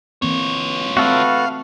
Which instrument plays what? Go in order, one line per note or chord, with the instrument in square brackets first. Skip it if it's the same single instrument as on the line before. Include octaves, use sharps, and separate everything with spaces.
[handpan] E3 A#3 C4 [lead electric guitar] F4 C#5
[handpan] A3 C4 E5 [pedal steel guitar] F#4 A4 B4 [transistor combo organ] F5